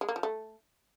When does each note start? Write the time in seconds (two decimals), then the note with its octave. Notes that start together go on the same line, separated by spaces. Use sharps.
0.01 G#3
0.09 A#3
0.16 F3
0.23 A3